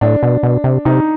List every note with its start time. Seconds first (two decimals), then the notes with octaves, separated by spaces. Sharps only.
0.01 A2 D4
0.23 B2
0.43 B2
0.64 C3
0.85 C3 D#4